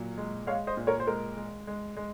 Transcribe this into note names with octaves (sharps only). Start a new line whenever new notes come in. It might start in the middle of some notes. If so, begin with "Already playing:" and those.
Already playing: A#2 F#3
G#3
G#3 C#5 F5
C5 D#5
A#2
A#4 C#5
C5
G#3 A#4
G#3
G#3
G#3